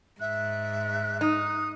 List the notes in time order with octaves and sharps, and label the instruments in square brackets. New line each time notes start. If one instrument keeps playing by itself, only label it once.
[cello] G#2 [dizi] E5 [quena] F#6
[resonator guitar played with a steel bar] D#4 [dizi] D#6